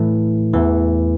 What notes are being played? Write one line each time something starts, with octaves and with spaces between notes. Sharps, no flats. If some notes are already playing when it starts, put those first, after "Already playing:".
Already playing: A2 E3 A3
E2 E3